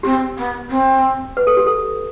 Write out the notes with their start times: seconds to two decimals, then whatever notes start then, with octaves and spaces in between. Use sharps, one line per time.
0.03 C4 G4
0.37 B3
0.69 C4
1.37 B4
1.47 A4
1.57 G4
1.67 A4